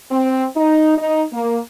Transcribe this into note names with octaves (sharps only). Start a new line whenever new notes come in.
C4
D#4
D#4
A#3